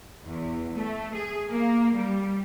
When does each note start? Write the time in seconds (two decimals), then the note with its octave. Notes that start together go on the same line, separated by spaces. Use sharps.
0.23 E2
0.75 A3
1.13 G#4
1.50 A#3
1.95 G3